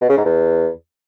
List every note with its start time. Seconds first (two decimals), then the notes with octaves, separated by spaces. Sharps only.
0.01 B2
0.09 C#3
0.17 G#2
0.25 E2